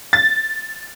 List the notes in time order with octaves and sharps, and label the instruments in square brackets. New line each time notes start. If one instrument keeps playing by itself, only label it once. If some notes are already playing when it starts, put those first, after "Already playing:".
[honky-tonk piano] A6